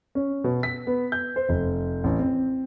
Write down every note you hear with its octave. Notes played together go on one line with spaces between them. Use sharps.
C#4
B2
B6
B3
G6
C5
F1
A1
C4